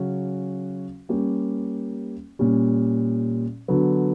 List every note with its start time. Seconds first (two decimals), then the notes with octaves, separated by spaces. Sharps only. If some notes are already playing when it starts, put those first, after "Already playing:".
Already playing: C#3 F#3 C#4 F#4
1.09 G3 A#3 C#4 G4
2.39 A#2 G3 C#4
3.68 D3 F#3 B3